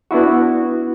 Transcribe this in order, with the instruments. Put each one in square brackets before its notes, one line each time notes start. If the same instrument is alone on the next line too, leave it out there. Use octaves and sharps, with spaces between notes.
[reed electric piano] B3 D4 E4 F#4